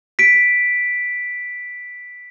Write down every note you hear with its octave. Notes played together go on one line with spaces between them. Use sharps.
B6 D7